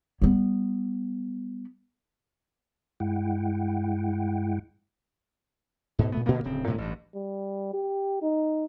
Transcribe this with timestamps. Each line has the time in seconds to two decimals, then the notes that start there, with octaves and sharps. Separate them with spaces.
0.22 G3 B3
3.00 G2 G#3 E4 F#5 G5
5.99 G#2 B2
6.12 A#2 A3 B3
6.26 A#2 D3 A#3 B3
6.44 D1 C#3 C4
6.66 D2 A2 C3 G#3
6.78 A1 G2
7.15 G3
7.74 G4
8.22 D#4